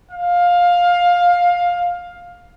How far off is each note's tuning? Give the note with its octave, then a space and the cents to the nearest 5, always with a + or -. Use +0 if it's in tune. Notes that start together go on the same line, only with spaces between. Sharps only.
F5 +15